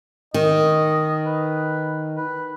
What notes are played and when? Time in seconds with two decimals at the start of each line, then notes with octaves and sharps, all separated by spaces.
0.34 D#3 D#5
1.26 B4
2.17 B4